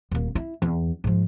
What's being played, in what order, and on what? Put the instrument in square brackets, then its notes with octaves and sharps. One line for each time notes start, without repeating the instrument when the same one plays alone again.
[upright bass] D#1 A#3
E4
E2
G#2 F3